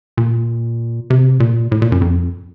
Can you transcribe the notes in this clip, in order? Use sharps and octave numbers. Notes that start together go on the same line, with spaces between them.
A#2
C3
A#2
A2
A#2
F#2
F2